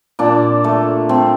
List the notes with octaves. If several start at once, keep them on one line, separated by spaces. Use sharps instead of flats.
A#2 D4
A3
A3 C4